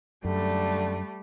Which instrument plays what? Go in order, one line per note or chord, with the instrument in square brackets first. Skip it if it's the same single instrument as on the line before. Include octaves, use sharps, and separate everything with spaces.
[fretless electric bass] F#2 [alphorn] D3 [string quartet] G3 A3